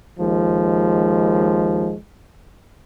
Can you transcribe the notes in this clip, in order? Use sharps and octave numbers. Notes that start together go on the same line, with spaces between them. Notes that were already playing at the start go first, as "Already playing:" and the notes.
D#2 F3 G#3